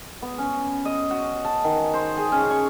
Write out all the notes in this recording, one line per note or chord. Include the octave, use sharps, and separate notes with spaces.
B3
C#4
D#5
F#4
A5
D#3
C5
G#4
C#4
C#6